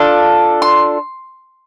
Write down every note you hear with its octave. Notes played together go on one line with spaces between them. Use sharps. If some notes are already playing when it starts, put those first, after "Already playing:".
Already playing: D4 F4 A4 D6
C6